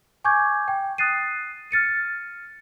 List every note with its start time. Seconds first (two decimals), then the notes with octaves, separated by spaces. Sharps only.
0.24 G#5 C#6 D6 G6 G#6
0.68 G5
0.98 D#6 F#6 A6 C7 D#7
1.71 F6 A6 C#7 D#7